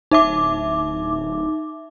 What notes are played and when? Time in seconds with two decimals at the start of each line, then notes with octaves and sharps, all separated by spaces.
0.11 D1 D#4 E5 D6